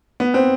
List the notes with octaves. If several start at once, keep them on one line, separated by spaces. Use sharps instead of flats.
B3
C4